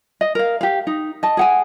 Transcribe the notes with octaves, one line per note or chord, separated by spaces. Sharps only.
D#5
A#4 F5
G4 F5
D#4
D#5 A5
G#4 F#5 G#5